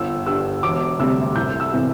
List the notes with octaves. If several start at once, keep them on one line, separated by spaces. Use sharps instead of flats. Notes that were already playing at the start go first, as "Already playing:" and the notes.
Already playing: G1 E6
G2 G3 E6
E1 D6
D2 C3 G3 E6
C2 G6
E6
C3 E3